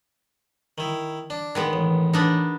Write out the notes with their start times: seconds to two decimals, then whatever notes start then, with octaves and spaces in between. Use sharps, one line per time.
0.78 D#3 E4
1.30 D4
1.55 D#3 G#3 B3
1.73 A1
2.13 B3 D4 D#4